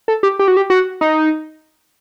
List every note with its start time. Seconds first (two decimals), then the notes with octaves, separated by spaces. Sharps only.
0.08 A4
0.23 G4
0.39 G4
0.48 F#4
0.57 G4
0.70 F#4
1.01 D#4